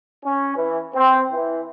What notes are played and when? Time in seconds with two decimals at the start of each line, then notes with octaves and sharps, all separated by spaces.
0.24 C#4
0.56 E3
0.94 C4
1.32 E3